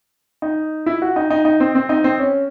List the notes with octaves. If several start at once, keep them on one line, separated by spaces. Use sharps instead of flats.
D#4
E4
F#4
D#4
D#4
D#4
C4
C4
D#4
C4
C#4